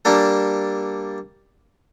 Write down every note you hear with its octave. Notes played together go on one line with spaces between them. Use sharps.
G3 A#3 D4 A4